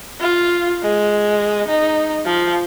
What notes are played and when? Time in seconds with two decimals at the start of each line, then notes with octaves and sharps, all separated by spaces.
0.20 F4
0.83 G#3
1.69 D#4
2.26 F3